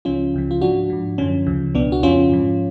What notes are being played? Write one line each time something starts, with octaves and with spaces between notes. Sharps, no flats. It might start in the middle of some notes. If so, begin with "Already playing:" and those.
C#2 C#3 F3 C#4 F4
C#2 C#3 F3
F4
G#2 F3 D4 F#4
G#2 F3
F#2 D3 F3 C#4
D2 C#3 F3
C#2 B2 B3 D4
F#4
F2 C#3 F3 C#4 F4
G#2 F3